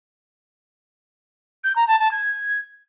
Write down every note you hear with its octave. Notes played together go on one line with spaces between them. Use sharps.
G6
A#5
A5
A5
G#6